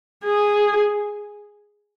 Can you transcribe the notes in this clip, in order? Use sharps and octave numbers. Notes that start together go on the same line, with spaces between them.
G#4